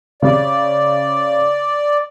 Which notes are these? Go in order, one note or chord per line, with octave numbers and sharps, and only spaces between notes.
C#3 D5